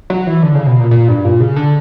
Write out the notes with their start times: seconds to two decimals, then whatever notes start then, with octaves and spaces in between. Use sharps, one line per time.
0.10 F#3
0.27 E3
0.43 D3
0.55 C#3
0.67 B2
0.79 A#2
0.91 A#2
1.08 G2
1.25 A#2
1.40 C#3
1.56 D3